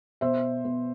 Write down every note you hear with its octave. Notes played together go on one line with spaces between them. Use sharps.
B2 C5 E5
B3